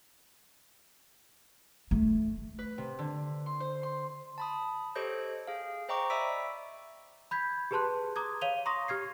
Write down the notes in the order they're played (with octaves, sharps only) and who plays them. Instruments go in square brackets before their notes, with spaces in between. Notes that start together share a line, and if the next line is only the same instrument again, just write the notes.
[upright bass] A3
[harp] B4
C3
D3
C6
C5
C6
[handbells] A5 B5 D#6
G4 A4 C5 C#5 D#5 G6
G#4 F5
C5 D#5 G5 A#5 C#6 D6
D5 E5 B5 E6 B6 D7
[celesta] B5 G6 G#6 B6
G4 G#4 B4 A5 C6 F#6
A#5 D6 D#6 G#6
C#5 F5 D#7 F7 G7
A#5 C6 C#6 D#6 A#6
G4 F6 G#6 C7